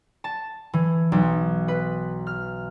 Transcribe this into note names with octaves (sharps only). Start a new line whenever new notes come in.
A5
E3
B1
B4
F6